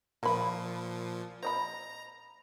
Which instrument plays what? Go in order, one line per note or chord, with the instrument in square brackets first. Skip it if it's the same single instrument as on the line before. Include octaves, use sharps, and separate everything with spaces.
[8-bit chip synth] A#2 F3 [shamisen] A#3 B5
[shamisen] C5 D#5 B5 [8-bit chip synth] A#5